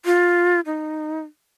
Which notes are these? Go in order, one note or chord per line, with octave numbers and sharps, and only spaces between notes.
F4
D#4